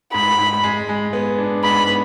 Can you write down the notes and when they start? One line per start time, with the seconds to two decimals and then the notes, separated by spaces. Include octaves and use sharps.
0.13 G#2 B5
0.38 G#2
0.63 G#3
0.89 G#3
1.13 B3
1.38 D4
1.63 G#2 B5
1.88 B3